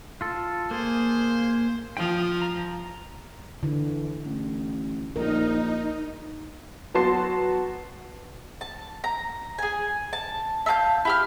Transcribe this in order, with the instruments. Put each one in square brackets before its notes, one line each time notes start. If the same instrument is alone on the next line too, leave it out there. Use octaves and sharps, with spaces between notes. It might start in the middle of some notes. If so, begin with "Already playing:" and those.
[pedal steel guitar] F4 A4
[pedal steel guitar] A#3 G#4 [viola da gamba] C5
[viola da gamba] F3 [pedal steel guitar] G5 D#6
[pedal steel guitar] A#5
[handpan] D3 [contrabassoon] E3
[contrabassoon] A1
[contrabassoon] A#1 [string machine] D#4 [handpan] A#4
[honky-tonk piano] F#3 B3 F#4 A5 C6 C7
[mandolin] A5
A#5
G#4 G#5
A5
E5 F5 A5 G6
E4 G4 F6